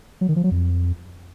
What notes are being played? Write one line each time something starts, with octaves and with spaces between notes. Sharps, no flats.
F#3
D#3
F3
F#3
F2